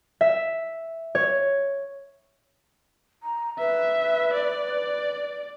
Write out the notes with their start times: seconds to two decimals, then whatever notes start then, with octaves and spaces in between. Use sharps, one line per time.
0.21 E5
1.15 C#5
3.23 A#5
3.59 B4 E5
4.34 D5